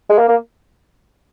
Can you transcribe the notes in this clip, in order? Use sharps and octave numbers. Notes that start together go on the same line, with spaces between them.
G#3
A#3
A#3